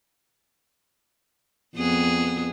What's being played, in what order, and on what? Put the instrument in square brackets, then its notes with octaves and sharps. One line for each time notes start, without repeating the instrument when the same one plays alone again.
[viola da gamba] F2 B3 G#4